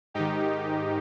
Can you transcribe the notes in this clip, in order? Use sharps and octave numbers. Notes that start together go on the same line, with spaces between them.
G#2 D#3 D#4 G4